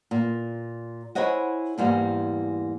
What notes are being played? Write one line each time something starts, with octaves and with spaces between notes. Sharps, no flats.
A#2
E4 G#4 C5 C#5 D#5 F#5
E2 G#2 G3 G#3 A#3